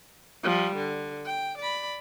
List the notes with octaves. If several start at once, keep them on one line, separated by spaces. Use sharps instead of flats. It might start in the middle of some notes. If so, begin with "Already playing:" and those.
F3 G3
D3
G5
D5 B5